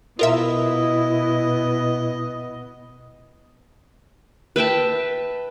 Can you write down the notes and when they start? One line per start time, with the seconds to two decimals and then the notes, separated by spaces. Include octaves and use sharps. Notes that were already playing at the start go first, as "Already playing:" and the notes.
0.19 B2 B3 E4 F4 A#4 D#5 E5
4.56 B4 E5 G5 A5